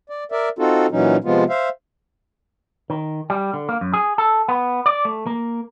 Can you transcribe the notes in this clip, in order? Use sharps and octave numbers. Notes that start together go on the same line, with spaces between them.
D5
A#4 D5 E5
C4 D#4 F4 F#4 A4
A#2 E3 F#3 C#4 D#4
C3 F3 G#3 B3 F4
C5 E5 F5
D#3
G3
D3
A#3
F#2
G#4
A4
B3
D5
A3
A#3